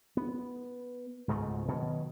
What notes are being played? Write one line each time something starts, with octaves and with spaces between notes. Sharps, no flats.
B3
C#2 G#2 B2 A3
B2 D#3 F#3